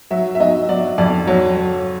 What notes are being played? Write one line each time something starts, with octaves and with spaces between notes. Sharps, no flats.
F#3 E5
E5
F#3 D#5
F#3 D5
F2 D5
F#3 C#5
F#3